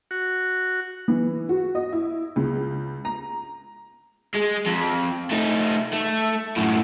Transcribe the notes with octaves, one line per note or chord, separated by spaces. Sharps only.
F#4
E3
F#4
D#5
E4
C#2
A#5
G#3
F2
A3 D#4
A3
F#2 A2